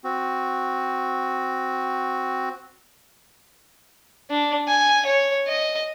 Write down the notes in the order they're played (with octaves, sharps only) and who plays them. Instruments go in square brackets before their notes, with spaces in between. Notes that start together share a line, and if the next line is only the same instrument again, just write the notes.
[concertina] C4 F#4
[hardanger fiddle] D4
G#5
C#5
D#5